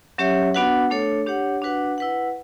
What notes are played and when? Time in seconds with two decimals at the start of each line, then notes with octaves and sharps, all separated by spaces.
0.18 F#3 C#4 G4 C#5 E5
0.54 B3 D4 F#4 B4 F#5
0.90 A3 D4 A4 C#5
1.27 D4 G4 C#5 F#5
1.62 D4 F#4 B4 F#5
1.98 E4 B4 F#5